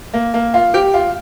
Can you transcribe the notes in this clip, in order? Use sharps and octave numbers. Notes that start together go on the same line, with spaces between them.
A#3
A#3
F4
G4
F4